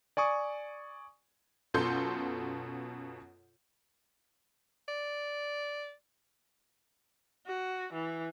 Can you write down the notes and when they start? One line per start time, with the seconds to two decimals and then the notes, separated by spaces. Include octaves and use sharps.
0.17 D5 G#5 C#6 D#6
1.74 F#2 B2 F4 A4 C6 G6
4.88 D5
7.47 F#4
7.93 E3